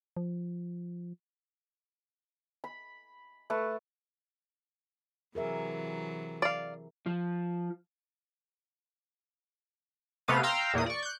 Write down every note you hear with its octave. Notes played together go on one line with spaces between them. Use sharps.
F3
B5
A3 B4 A5 C#6
C3 E3 F#3 G#4 A#4 E5
D5 F5
F3
C3 A3 B3 F5 D#7
F5 G5 A#5 C6 E6
E2 A#2 A#3 D#6
D5 C#6
F#6 G6